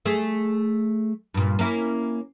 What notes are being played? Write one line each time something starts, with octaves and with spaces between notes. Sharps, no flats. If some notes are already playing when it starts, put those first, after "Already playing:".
A3 G#4
G2 A#2
A#3 C#4 E4